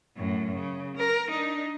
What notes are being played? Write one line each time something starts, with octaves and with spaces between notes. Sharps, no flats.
F#2 A2
C#3
A#4
D4 D#4